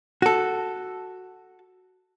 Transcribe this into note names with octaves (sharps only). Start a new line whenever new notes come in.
F#4 A4